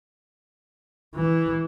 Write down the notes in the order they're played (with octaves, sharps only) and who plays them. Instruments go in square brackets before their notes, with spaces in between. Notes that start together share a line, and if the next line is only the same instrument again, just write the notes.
[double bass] E3